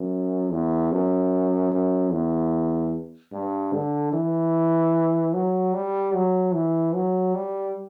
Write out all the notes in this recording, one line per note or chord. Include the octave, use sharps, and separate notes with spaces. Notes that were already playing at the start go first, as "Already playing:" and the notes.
Already playing: F#2
E2
F#2
F#2
E2
G2
D3
E3
F#3
G3
F#3
E3
F#3
G3